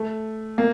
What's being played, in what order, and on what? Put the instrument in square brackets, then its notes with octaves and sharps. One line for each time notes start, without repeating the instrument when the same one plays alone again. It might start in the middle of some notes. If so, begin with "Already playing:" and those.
Already playing: [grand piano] A3
A#3